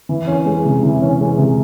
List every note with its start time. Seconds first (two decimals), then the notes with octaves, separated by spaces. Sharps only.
0.09 E3
0.27 C#4
0.46 G#3
0.65 C3
0.83 E3
1.02 C#4
1.20 G#3
1.38 C3